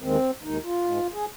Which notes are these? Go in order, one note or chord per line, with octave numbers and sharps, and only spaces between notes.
D#2 D#3 G#3 C4
D#2 D#3 G#3 D#4
F4
G#2 G#3
G#4